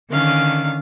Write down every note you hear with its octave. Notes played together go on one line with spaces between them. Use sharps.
D3 D#3 C#4 F5